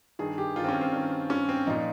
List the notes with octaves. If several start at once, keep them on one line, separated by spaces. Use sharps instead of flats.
G2 D#3 G#4
G4
G2 D#3 F4
C4
C#4
C4
G2 D#3
G2 D#3 C#4
C4
A#2 F3 D#4